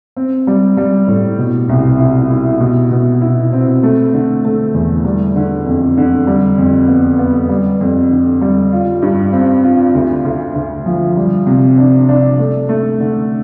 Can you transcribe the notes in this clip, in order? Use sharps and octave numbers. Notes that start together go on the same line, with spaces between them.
C4
G3
G3
A2
B2
C2
E4
E4
B2
B2
E4
C4
A3
D3
A3
E2
G3
D3
F2
D3
G3
F2
B3
B3
G3
F2
D3
G3
F4
G2
C4
F4
D2
D2
D2
F3
G3
C3
D4
D4
A3
A3
D3